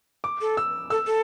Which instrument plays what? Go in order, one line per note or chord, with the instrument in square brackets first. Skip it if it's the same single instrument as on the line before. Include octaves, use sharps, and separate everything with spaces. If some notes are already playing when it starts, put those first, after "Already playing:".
[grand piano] D6
[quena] A4
[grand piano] E6
[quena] A4 [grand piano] E6
[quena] A4